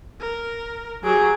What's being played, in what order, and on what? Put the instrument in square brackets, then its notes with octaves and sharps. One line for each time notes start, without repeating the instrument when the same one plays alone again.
[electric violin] A#4
[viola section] F#3 [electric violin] G4 D7 [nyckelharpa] G#4